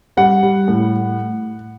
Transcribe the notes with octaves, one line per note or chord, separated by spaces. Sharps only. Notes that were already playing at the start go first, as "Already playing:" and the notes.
G3 F#5
G3
A2